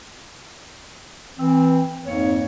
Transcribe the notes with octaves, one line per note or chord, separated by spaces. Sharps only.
E3 C4
F2 G#2 A#3 C#5